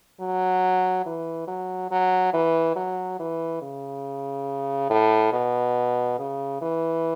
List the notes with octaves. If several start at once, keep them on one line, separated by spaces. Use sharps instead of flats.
F#3
E3
F#3
F#3
E3
F#3
E3
C#3
A2
B2
C#3
E3